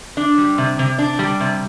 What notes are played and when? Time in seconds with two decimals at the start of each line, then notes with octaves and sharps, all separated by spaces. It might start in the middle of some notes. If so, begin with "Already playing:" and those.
0.17 D4
0.38 G3
0.58 C3
0.79 C3
0.98 D4
1.19 G3
1.40 C3